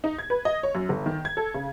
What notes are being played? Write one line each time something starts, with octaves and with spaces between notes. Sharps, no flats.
D#4
G#6
B4
D#5
C#5
F#2
G1
D#3
G#6
A4
C#3